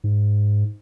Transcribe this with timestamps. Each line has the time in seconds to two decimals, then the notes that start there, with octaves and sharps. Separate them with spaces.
0.04 G#2